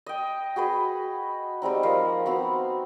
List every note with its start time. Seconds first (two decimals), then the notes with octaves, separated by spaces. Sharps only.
0.06 D#5 G5
0.56 F#4 G#4 B4 D#5
1.62 G3 G#3 C4 D#4
1.83 F3 A#3 D#5 F5
2.26 B3 C4 F#4